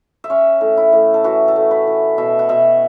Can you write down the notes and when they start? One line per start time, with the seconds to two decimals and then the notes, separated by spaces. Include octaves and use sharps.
0.24 E5
0.30 C#4 C#5
0.61 A2
0.77 E4
0.93 A2
1.14 A4
1.24 E3 F#4
1.48 A4
1.56 A3
1.71 B4
1.87 E3
2.18 B2 E5
2.39 F#5
2.49 B2 E5